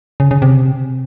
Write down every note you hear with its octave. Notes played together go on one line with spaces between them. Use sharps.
C#3
C#3
C3